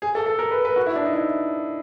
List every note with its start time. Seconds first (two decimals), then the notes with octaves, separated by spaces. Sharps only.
0.02 G#4
0.15 A4
0.26 A4
0.39 A#4
0.51 B4
0.65 B4
0.76 F#4
0.86 E4
0.96 D4
1.05 D#4
1.14 E4